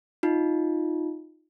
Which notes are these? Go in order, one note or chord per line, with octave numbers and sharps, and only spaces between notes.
D#4 F4